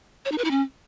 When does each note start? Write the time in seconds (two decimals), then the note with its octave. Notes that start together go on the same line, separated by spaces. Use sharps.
0.25 C#5
0.32 D#4
0.38 B4
0.44 E4
0.51 C#4